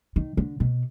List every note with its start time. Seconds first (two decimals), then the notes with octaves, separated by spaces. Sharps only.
0.16 D#3
0.37 D3
0.60 B2